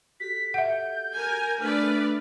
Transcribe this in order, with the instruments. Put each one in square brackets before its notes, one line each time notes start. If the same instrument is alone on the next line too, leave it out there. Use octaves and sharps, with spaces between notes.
[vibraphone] F#4 G4 A4 [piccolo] B6
[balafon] E5 F#5 [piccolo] G6
[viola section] A#4 G#5
[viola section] A3 B4 D5 [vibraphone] D4 [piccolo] F6